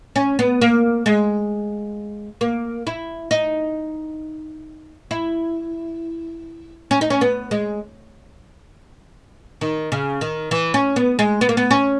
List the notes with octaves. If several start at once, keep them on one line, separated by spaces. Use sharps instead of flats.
C#4
B3
A#3
G#3
A#3
E4
D#4
E4
C#4
D#4
C#4
B3
G#3
D#3
C#3
D#3
E3
C#4
B3
G#3
B3
A#3
B3
C#4